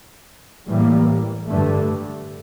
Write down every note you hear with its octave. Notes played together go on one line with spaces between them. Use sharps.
A2 E3 G3 A#3
G2 D3 A3